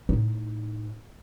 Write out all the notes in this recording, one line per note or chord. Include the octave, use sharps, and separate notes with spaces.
A2 D#4